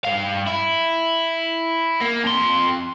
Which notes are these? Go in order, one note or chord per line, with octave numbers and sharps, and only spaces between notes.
G2 F5
E4
A#3
F2 C6